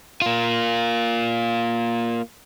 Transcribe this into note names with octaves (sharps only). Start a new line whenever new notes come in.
A#3 F4